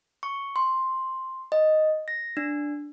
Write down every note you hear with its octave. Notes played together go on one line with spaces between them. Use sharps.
C#6
C6
D#5
A#6
D4